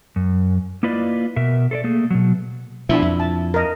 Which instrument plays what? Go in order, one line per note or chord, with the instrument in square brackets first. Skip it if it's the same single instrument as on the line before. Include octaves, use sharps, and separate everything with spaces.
[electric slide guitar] F#2
A#3 E4 F4 B4 D5 D#5
B2 A#4 E5
A4 C5 D5
A3 A#3 G#4
B2 F#3
[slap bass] B2 F3 [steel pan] D4 E4 E5
[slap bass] F2
[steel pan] A5
A#4 D#5